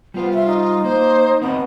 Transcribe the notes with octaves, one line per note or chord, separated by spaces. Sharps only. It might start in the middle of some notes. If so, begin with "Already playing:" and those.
G3 B3 F4 C5
E5
D#4
A#3 C5
B3 C4 F#4 C#5 D#5